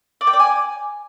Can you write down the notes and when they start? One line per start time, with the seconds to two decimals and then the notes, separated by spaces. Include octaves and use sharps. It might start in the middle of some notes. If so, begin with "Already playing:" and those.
0.21 D5
0.27 G5
0.33 D5
0.39 G#5